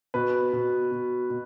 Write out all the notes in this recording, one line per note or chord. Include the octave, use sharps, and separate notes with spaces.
B2 B4
B2
B2
B2